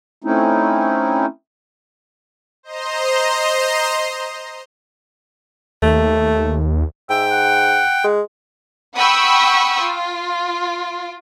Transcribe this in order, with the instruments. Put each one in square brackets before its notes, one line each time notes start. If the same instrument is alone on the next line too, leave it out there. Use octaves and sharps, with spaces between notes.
[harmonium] A3 C4 C#4 D#4 E4
[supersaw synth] C5 D#5 A#5 C6
[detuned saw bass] D#2 [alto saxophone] A3
[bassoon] G#2 [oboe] E5 [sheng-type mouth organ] G5
[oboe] F#5
[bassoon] G#3
[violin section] F#5 G5 B5 C#6 D#6 E6
F4